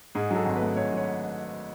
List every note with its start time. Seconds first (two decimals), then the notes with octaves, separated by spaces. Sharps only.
0.15 G#2 G#4
0.31 F#3
0.36 A4
0.45 G#1
0.56 B4
0.61 A3
0.76 G#2 C#5
0.92 F#3 C#5